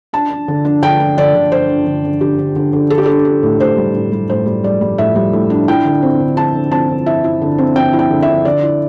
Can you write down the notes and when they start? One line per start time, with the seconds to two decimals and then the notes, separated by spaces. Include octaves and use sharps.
0.13 D4 A5
0.30 D4
0.48 D3
0.65 D4
0.83 D3 G5
1.00 D4
1.17 D3 D5
1.35 D3
1.52 D3 C5
1.69 D4
1.87 D3
2.04 D3
2.21 D3 G4
2.38 D3
2.56 D3
2.73 D3
2.90 D4 A4
2.98 G4
3.06 D4 A4
3.25 D4
3.43 A2
3.60 A2 C5
3.77 G3
3.94 A2
4.12 G3
4.29 A2 C5
4.46 G3
4.64 G3 D5
4.81 G3
4.98 A2 E5
5.16 G3
5.33 A2
5.50 D4
5.68 E4 G5
5.85 D3
6.02 C4
6.20 D3
6.37 E4 A5
6.54 D3
6.71 C4 A5
6.89 D3
7.06 E4 E5
7.24 E4
7.42 D3
7.58 C4
7.76 C4 G5
7.93 E4
7.99 G5
8.11 D3
8.23 D3 E5
8.45 D3 D5
8.63 E4